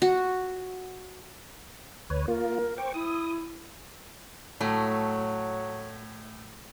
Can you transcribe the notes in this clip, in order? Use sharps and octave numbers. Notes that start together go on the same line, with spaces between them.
F#4
D2 B4 C#5
A#3 F4 A#4
C5 G5 C#6 D6
E4 D#6
A2 F#3 A3